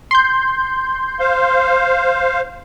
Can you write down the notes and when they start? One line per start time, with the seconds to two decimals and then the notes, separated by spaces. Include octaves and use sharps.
0.11 C6 G6
1.20 C5 F5